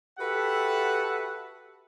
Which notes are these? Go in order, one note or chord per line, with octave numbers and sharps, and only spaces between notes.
F#4 G4 A4 B4 E5 F#5